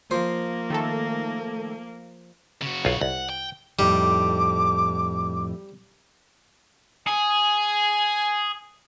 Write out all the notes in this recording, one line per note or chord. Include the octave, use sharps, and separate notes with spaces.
F3 A#3 C5
D#3 A3 A4
C#3 F#4
B1 F4
C2 F#5
G5
F2 A2 G3 D#4 D6
G#4 G#5